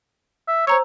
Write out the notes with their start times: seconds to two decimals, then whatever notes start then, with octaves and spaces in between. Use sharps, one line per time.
0.48 E5
0.67 C5 C#5 A#5 E6